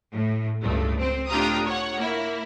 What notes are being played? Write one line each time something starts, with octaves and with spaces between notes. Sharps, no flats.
A2
C#2 G2 A3
C4 C5
A2 D4 F4 G4 A#5 D#6
C#5 F#5
A#3 E4